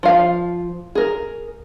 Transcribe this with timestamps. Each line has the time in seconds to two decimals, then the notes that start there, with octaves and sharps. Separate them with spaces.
0.03 F3 F5
0.95 G#4 A#4